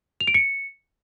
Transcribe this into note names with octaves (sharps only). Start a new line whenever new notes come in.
F7
D7
C#7